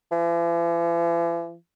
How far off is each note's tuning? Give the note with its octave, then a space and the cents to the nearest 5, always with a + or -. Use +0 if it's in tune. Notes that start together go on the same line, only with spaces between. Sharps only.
E3 +45